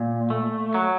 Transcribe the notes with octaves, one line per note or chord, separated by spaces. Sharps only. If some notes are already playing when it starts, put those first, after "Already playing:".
Already playing: A#2
A3
F#3